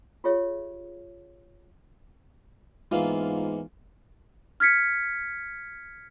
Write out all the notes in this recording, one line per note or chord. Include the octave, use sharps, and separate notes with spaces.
F4 G4 G#4 C#5 E5
G#2 E3 A#3 B3 F4 F5
F6 G#6 B6 C#7